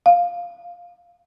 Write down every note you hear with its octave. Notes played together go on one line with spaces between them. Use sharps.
F5